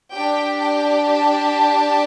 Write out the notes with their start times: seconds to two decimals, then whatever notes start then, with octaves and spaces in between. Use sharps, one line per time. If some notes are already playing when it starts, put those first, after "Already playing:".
0.13 D4 G4 G5
0.60 G5
1.08 A5